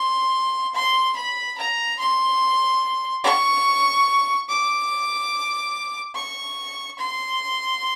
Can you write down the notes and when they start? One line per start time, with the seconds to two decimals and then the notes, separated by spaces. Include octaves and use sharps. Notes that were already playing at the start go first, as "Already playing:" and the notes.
Already playing: C6
0.75 C6
1.16 B5
1.58 A#5
1.99 C6
3.24 C#6
4.49 D6
6.15 C#6
6.99 C6